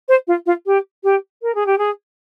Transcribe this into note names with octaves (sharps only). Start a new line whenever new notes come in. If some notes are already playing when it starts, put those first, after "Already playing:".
C5
F4
F4
G4
G4
A#4
G#4
G4
G#4